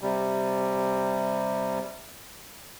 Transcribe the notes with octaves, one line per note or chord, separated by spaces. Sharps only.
C3 G3